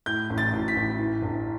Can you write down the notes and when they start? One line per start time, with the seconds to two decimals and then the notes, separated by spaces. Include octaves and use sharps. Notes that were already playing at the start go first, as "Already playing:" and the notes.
0.06 A2 G6
0.30 A1
0.38 A6
0.53 A1
0.68 B6
0.76 A1
0.99 E3
1.22 G1